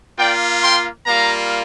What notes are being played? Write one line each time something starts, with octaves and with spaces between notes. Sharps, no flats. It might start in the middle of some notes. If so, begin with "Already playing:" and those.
A#3 F4 D5 G5
G5 C6
G3 A#3 F4 F5 A#5